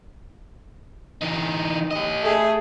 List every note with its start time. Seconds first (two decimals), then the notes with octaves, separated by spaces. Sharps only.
1.21 E3 D#4
1.91 G4 D#5
2.22 A3 G#4